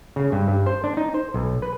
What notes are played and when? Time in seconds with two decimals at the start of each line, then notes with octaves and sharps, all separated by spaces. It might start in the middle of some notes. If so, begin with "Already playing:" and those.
0.16 C#3
0.32 G2
0.48 G2
0.66 C5
0.84 D4
0.97 D#4
1.14 C5
1.34 B1
1.62 B4